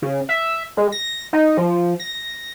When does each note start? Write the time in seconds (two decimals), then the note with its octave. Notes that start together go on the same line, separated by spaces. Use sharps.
0.02 C#3
0.29 E5
0.77 G#3
0.92 A#6
1.33 D#4
1.57 F3
2.00 A#6